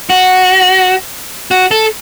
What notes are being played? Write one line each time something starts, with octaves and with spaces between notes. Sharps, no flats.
F#4
F#4
A4